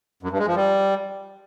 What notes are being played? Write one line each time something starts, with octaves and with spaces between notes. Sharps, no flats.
F#2
G2
G#3
F3
G3